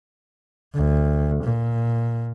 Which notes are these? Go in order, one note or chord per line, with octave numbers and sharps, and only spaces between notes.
D2
A#2